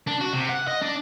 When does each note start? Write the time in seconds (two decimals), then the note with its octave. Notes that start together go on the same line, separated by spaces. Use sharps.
0.08 D4
0.21 F#4
0.33 C3
0.49 F#5
0.67 D#5
0.82 D4 D5